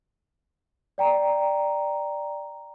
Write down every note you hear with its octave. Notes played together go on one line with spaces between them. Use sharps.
D5 G5 A#5